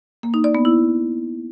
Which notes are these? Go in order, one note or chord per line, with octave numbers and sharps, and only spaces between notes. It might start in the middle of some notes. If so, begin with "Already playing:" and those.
A#3
D#4
D5
B3
E4